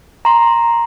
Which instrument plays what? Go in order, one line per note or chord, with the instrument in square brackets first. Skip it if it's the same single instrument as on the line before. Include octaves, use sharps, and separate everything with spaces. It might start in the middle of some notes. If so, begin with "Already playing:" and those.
[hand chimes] A#5 C6